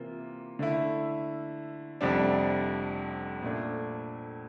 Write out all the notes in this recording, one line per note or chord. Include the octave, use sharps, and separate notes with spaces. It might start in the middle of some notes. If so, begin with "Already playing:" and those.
Already playing: C3 E3 A#3 F4
D3 A3 E4
F1 F2 C3 G3 D4
A#2 A3 D4